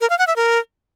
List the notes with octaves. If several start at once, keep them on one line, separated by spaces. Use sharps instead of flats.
A#4
F5
F#5
E5
A#4